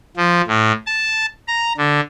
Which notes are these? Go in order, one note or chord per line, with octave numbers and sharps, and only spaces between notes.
F3
A2
A5
A#5
D3